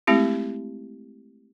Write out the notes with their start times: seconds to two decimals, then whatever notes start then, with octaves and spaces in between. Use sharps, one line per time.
0.07 G#3 A3 C4 E4 G4